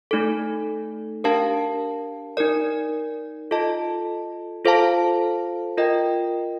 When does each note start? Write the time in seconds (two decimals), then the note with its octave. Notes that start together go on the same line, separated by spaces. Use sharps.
0.11 A3 D#4 A4
1.24 D4 G4 A#4 F5 A5
2.37 D#4 A#4 D5
3.51 F4 A4 D#5 A5
4.65 F4 A4 C5 F5 A5
5.77 F4 A#4 D#5 G5